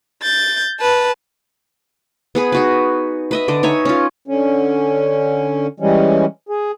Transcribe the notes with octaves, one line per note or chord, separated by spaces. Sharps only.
G6 A6
B4 A5
B3 G#4 B4
D#4 F#4 B4
B4 D#5 E5
D3 D5 D#5
D#4 C#5 E5 G#5
C#4 F4
D3 C#4
E3 G3 G#3 C#4
G#4